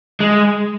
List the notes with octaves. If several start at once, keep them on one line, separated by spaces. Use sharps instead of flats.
G#3